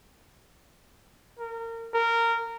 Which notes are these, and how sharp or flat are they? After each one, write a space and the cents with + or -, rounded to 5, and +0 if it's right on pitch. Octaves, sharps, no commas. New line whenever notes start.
A#4 -25
A#4 -15